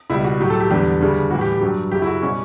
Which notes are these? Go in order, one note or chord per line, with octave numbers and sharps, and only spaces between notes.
C#2 B2 G3 E4
F#4
A2 F#3 G4
A4
G4
E2 D3 G3 G4
D2 C#3 G3
A2 E3 G3 F#4
G4
G4
G2 F#3
F#2 C#3 F#3 G4
E4
F#4
B2 G3 C#4